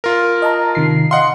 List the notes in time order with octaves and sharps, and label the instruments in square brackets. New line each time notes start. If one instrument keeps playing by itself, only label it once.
[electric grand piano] F4 A#4
[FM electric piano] D#5 A5 A#5
C3 D#3 C7
[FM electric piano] D#5 F5 [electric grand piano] F#5 C6